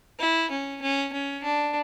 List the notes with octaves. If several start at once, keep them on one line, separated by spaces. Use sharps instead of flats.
E4
C#4
C#4
C#4
D4